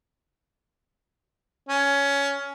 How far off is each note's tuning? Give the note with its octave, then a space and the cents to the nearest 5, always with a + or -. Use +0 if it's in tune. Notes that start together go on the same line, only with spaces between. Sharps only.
C#4 +15